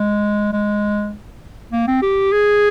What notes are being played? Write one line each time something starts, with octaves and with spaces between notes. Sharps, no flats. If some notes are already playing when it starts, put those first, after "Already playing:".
Already playing: G#3
G#3
A#3
C4
G4
G#4